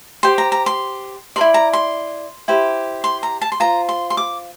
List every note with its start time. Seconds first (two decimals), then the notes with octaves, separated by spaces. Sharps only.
0.23 G4 C5 C6
0.38 A#5
0.52 A#5
0.66 C6
1.36 A#4 D5 C6
1.41 E4
1.54 A#5
1.73 C6
2.48 E4 G4 C5
3.04 C6
3.23 A#5
3.41 A5
3.52 C6
3.60 F4 C5 A#5
3.89 C6
4.10 C6
4.17 D6